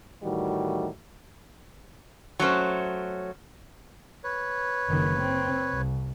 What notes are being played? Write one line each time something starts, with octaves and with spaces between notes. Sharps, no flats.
A2 D#3 E3 G3 F#4
F#3 A3 C#4 C5
B4 C#5
F#1 D#3
C4
C2